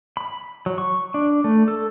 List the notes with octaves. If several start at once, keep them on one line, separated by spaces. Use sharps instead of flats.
B5
F#3
C#6
D4
A3
A4